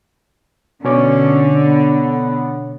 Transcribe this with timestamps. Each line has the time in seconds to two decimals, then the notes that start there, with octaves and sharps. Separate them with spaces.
0.85 B2 D3 C#4 C#5 D6
1.66 B3